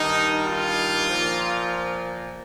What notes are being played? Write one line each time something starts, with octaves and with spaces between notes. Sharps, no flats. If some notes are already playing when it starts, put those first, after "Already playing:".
Already playing: G2 D#3 D#4
F4
A#2 F3